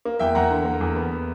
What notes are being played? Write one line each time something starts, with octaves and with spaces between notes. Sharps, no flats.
A#3
E2 E5 G5
E2 F#5 A#5
D3
A#3
E2
B3